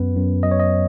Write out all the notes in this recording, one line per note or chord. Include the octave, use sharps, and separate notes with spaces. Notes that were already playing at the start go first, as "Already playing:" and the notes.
Already playing: F#2 B3 B4
F#2
F#3 D#5
C#5
D#5